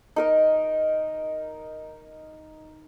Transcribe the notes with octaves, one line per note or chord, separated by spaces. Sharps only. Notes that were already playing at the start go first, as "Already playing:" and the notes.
D#4 A#4 D#5